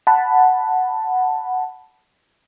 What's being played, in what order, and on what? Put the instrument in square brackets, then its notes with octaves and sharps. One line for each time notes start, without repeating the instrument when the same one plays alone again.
[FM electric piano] F#5 A5 B5